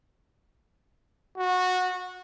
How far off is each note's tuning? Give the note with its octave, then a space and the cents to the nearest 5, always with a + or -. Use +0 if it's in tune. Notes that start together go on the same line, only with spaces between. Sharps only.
F#4 -20